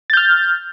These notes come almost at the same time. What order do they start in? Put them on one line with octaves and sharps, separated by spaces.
A6 G6 F6